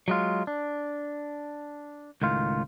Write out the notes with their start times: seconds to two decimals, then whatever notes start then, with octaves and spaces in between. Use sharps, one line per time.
0.08 F#3 G#3 F4
0.47 D4
2.22 C#2 A2 D#3 F4